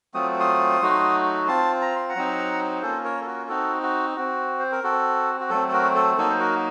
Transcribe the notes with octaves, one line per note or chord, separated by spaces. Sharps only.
F#3 A3 C4 F4 D#6
C6 D#6
F#3 A3 D#4 F#4
C4 F4 A5 C6
A#5
C6
F#5 A#5
F#3 C4 D#4
A#3 C#4 F4 A4 C5
A#4 C#5
A4
F#4 A#4
C4 D#4 F#4 A4
F#4
C4 F#4
C5
A#4
C4 F#4 A4
F#4
F#3 A3 C4 A4
A4
F#4 A#4
A4
F#3 A#3 D#4 A4
C5
F#4 A#4